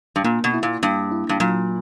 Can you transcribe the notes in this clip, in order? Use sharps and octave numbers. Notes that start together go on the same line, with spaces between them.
G2
A#2 A#3
B2
E4
A#2
G2 A#3
E4
G2
A#2 F#3